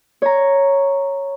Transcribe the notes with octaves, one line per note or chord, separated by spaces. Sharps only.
C#5 A#5